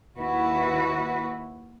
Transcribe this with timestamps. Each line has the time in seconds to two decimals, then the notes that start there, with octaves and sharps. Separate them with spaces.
0.17 D#2 E4 F#4 B4